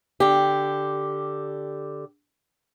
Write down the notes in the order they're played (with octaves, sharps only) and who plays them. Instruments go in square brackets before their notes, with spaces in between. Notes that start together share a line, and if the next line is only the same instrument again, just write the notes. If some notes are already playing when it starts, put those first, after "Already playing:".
[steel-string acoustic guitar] D3 G4